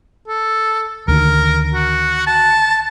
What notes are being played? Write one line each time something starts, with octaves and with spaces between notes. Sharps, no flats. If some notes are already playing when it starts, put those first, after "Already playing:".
A4
D2 D3 D#3 A#4
F#4
A5